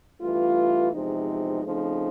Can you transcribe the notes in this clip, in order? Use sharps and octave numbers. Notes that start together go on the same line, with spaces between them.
G2 E3 A3 F4
E2 C3 F3 G#3 D#4
C#3 F3 A3 C4 D#4